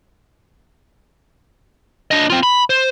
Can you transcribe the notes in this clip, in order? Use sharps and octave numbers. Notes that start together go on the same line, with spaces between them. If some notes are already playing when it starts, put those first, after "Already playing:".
D4 D#5
C4 F4
B5
C5